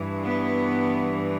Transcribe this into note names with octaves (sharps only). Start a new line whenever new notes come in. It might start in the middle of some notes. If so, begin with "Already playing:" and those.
Already playing: G2 E3
B3